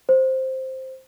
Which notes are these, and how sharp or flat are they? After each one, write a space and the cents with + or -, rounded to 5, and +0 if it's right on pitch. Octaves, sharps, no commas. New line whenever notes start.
C5 +5